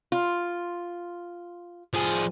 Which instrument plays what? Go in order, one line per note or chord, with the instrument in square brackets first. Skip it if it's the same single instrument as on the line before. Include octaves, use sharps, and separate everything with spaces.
[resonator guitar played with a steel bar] F4
[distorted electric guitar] F3 G#4